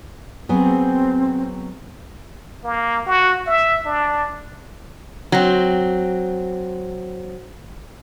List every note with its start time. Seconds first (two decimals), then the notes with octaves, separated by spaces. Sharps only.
0.49 F#3 B3 C4 G#4
2.64 A#3
3.06 F#4
3.47 E5
3.86 D4
5.32 F#3 C4